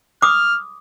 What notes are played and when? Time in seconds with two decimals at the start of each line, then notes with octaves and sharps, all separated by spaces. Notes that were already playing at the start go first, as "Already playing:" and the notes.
0.22 D6 D#6 F6